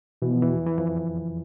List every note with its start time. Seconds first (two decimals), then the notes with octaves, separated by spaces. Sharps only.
0.22 B2 E3
0.32 F3
0.42 E2 E3
0.66 E3
0.78 F2 F3